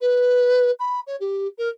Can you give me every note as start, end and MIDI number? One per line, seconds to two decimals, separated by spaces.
0.01 0.71 71
0.80 1.00 83
1.07 1.16 73
1.20 1.47 67
1.58 1.69 70